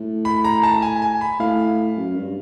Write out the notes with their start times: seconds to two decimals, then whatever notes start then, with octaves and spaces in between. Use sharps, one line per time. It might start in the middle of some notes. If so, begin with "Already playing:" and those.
Already playing: A2
0.25 B5
0.44 A#5
0.63 A5
0.82 G#5
1.02 G#5
1.21 B5
1.40 A2 F5
1.97 F#2
2.16 G2